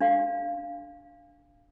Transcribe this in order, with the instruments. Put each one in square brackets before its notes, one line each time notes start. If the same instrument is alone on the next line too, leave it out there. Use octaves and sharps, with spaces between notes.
[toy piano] D4 F5